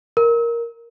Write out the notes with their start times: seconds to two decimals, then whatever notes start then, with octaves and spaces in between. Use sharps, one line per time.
0.17 A#4